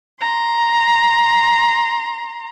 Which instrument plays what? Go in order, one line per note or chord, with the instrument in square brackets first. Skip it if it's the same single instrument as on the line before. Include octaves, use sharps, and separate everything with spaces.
[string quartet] A#5 C6